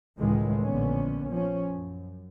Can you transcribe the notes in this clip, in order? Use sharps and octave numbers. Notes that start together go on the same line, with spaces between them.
C#2 A2 D#3 E3 G#3
A#1 A#2 D3 B3 C#4
F3 C#4
F#2